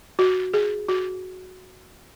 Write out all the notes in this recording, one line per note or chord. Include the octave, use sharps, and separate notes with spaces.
F#4
G#4
F#4